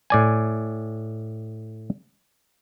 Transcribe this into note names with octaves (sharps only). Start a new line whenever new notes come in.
A2 D5 G#5